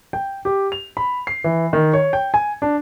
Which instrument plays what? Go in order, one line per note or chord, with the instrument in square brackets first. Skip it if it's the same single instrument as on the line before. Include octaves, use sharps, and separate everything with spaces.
[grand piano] G5
G4
F7
B5
C7
E3
D#3
C#5
G5
G#5
D4